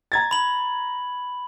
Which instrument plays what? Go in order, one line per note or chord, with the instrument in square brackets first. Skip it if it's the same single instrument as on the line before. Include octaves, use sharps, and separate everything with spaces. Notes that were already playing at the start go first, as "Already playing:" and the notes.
[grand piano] A#5 G#6 A6
[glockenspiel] B5 F#7